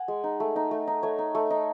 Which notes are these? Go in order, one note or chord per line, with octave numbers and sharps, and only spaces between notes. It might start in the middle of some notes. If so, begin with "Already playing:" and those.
Already playing: F#5 G#5
G#3
D#4
A3
D#4
A3
D#4
A3 C#5
D#4
A3
D#4